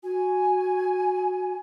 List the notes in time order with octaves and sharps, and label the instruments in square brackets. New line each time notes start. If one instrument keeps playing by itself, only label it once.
[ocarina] F#4 [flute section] G#5